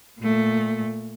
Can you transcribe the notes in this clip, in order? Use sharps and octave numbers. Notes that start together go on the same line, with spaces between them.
A#2 A3